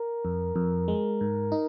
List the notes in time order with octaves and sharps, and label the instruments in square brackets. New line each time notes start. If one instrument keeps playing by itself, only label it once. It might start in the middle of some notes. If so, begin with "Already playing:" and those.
Already playing: [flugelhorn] A#4
[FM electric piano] F2
F2
G#3
G#2
D#4